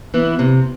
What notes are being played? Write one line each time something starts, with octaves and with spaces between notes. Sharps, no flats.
E3 B3 E4
C3